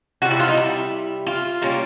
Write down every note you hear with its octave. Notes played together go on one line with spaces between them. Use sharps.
C3 E3 G3 F#4
E4
F4
D#4
E4
F4
A#2 G3 A#3 C#4